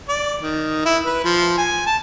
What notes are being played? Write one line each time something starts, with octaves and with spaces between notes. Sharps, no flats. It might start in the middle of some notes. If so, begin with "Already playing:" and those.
D5
D#3
E4
B4
F3
G#5
A5